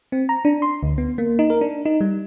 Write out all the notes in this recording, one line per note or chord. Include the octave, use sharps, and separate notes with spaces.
C4
A#5
D4
C6
D2
B3
A#3
D#4
A#4
D4
D#4
G3